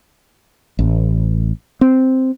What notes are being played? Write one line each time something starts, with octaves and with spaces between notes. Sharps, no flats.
A1
C4